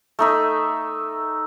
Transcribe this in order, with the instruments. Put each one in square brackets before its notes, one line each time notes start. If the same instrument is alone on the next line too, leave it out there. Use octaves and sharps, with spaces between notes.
[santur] A3 D#4 E5